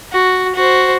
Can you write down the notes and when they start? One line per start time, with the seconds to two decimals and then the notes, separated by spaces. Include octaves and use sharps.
0.13 F#4
0.55 F#4 C5